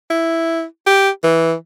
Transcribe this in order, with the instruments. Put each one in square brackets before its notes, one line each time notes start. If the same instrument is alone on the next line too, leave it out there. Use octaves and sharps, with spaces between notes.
[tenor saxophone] E4
G4
E3